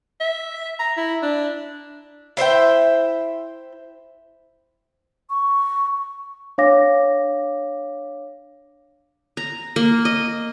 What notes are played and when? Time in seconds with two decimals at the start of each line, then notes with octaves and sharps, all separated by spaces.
0.20 E5
0.79 A#5
0.97 E4
1.23 D4
2.37 E4 C5 E5 G5
5.30 C#6
6.58 D4 C#5 F5 D6 A#6
9.37 A#5
9.76 A#3
10.05 D#5